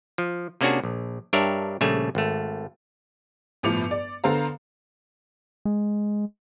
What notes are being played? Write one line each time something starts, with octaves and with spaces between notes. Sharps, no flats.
F3
C3 A#3 C#4 D4 F#4 G#4
A#1
G2 D4 G4 A#4 C#5 E5
A#1 C#3 G3 A3 G#5
G#1 A3
G1 A2 F3 D6 C#7 F7
D5
D3 B3 A4 C5 F5 A#5
G#3